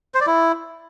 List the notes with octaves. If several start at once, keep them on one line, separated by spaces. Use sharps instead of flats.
C5
D5
E4